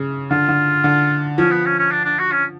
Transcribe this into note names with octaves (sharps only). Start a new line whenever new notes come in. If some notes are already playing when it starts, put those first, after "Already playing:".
Already playing: C#3
D3 F4
D3
D3
F3 C#4
B3
C#4
C#4
D4
D4
F#4
C#4